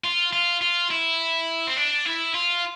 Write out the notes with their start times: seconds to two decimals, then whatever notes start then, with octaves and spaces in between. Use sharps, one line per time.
0.04 F4
0.33 F4
0.61 F4
0.91 E4
1.67 C4
1.77 D4
2.05 E4
2.34 F4